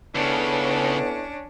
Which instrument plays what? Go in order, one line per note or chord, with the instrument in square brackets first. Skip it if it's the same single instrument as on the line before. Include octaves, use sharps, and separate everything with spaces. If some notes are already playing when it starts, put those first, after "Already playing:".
[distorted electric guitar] C#2 C#3 [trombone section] B3 E4 A4 [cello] C#4 D4